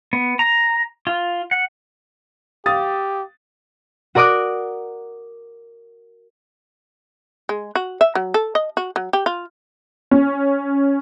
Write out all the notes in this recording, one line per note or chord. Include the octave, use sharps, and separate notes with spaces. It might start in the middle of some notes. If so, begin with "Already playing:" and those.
B3
A#5
F4
F#5
G4 F5 D#6 A6
F#4 A#4 D5 D6 D#6 F#6
G#3
F#4
E5
F#3
A4
D#5
F#4
F#3
G4
F4
C#4